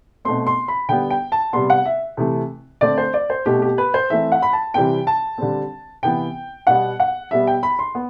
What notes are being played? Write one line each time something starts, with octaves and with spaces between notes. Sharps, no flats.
B2 A3 C4 C6
C6
B5
D3 G3 B3 G5
G5
A5
C3 G3 B3 C6
F#5
E5
C3 E3 A3
D3 A3 C4 D5
C5
D5
C5
B2 A3 C4 G4
G4
B4
C5
E3 A3 C4 E5
F#5
B5
A5
C3 E3 G3 C4 G5
A5
D3 G3 C4
C3 E3 B3 G5
B2 G3 B3 F#5
F#5
B2 G3 B3 E5
G5
B5
C6
B3